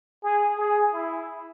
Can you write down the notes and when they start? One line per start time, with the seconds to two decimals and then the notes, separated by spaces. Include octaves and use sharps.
0.23 G#4
0.58 G#4
0.93 E4